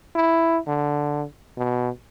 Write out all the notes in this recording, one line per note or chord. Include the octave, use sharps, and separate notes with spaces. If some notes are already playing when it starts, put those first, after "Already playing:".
E4
D3
B2